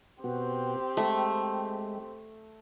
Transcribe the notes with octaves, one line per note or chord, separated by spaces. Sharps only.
B2 B3 C4 F#4 G4
G#3 A3